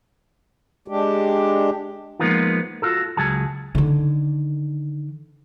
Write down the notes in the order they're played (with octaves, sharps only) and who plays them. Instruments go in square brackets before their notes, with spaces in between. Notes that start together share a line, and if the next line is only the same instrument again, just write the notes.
[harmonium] G#3 D4 G4
[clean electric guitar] F3 G#3 A#3 B3 D#4 F4
F4 F#4 A4
C#2 F#3 G#4 A5
[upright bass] D3 D#3